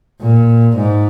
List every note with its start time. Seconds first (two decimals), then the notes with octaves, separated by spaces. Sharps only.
0.21 A#2
0.77 G#2